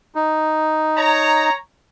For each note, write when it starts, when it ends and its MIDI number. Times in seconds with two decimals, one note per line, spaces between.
0.15 1.49 63
0.97 1.54 73
0.97 1.54 82